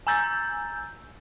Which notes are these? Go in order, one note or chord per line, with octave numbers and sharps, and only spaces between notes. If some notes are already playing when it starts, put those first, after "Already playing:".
G#5 A#5 E6 G6 A6